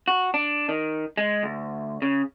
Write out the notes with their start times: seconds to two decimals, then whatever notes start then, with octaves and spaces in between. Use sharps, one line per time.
0.08 F#4
0.34 D4
0.69 D#3
1.17 G#3
1.43 D2
2.02 C#3